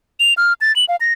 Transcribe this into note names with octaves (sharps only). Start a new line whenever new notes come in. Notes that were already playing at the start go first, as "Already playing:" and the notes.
F7
F6
A6
F#7
F5
A#6